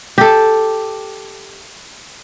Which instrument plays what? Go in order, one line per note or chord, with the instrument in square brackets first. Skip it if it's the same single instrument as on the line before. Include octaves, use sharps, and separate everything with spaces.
[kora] G4 A4